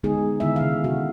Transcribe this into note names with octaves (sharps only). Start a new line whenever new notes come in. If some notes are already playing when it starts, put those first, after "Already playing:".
D3 G#3 B3 D#4 G#4
D3 D#3 B3 E4 E5
C#3 F5
C3 F#4